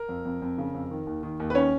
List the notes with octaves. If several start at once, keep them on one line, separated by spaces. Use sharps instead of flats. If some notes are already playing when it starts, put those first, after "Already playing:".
Already playing: A#4
F2
F2
F2
C#3
F2
D#3
D#2
D#3
D#2
B4
D#3 C#4 C#5